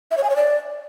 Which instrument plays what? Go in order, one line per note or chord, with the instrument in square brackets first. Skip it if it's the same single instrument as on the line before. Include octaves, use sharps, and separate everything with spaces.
[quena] E5
C#5
G#5
C#5
D5